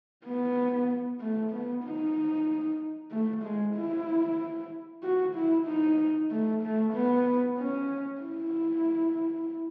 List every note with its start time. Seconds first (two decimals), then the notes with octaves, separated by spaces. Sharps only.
0.25 B3
1.20 A3
1.52 B3
1.84 D#4
3.11 A3
3.43 G#3
3.75 E4
5.03 F#4
5.35 E4
5.66 D#4
6.31 A3
6.63 A3
6.93 B3
7.58 C#4
8.21 E4